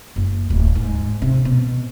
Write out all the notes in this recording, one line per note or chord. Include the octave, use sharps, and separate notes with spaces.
F#1
D1
G#2
C3
B2